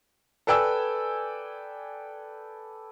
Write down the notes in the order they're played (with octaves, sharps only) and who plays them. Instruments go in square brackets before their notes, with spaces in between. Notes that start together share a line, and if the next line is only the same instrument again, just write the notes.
[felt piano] A4 B4 D5 G5 G#5 E6